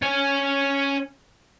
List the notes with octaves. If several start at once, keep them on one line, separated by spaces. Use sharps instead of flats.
C#4 C#5